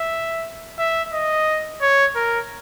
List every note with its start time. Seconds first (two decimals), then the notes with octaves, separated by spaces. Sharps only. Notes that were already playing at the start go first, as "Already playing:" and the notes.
Already playing: E5
0.79 E5
1.13 D#5
1.82 C#5
2.16 A#4